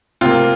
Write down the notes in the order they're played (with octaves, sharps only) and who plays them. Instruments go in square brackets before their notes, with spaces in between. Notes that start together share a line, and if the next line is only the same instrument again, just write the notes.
[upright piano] C3 A#3 C4 F4